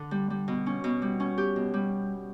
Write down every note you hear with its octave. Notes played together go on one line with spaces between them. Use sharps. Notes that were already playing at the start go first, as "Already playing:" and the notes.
Already playing: D3
G3
G3
B2
C#4
B2
G3
C#4
G4
B2
G3